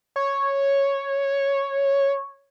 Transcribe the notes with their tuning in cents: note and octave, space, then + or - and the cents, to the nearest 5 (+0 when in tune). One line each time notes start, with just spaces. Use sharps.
C#5 -5